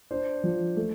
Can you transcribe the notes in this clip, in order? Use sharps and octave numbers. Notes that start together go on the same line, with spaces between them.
D4 C5
F3
A3